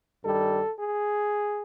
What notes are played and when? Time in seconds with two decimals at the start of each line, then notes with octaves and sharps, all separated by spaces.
0.23 G2 D#3 G3 A4
0.80 G#4